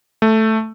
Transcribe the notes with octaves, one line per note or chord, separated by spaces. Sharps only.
A3